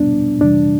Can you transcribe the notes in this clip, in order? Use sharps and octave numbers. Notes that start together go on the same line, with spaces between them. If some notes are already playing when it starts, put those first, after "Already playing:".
Already playing: E2 B2 G3 B3 D4
F2 C3 E3 G3 D4